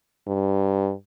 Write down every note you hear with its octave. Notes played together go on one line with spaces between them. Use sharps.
G2